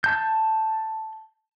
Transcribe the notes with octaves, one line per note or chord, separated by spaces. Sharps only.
A5 G6